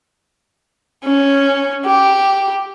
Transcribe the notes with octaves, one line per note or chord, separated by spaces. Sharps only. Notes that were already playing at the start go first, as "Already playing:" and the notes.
C#4
G4